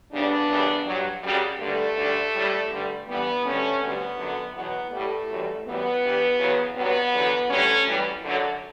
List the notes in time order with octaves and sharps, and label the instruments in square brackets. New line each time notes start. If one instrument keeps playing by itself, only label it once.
[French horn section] D2 C#3 G3 B3 D4
F#2 C#3 E3 G3
G2 F#3
F#2 C#3 G3
G2 D3 G3 A3
D2 D3 G3
A2 G3
G2 D3 G3
G2 E3 G3 B3
D2 D3 G3 A3 C#4
D2 D3 G3 B3
F#2 D3 F#3
E2 B2 F#3 B3
A2 G3 A3
F#2 E3 G3
F#2 E3 G3 B3
G2 E3 G3
E2 C#3 F#3
G2 F#3 B3
E2 D3 F#3
D2 D3 G3 A3 C#4
F#2 E3 G3
F#2 D3 F#3